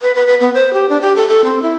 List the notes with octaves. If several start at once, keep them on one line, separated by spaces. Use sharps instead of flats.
B4
B4
B4
B3
C5
G4
D4
G4
A4
A4
C4
E4